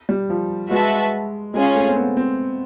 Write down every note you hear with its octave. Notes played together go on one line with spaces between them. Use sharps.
G3
F3
G#3 F#4 B4 E5 A5
G#3 C#4 F4 G#4
A3
C4
B3
C4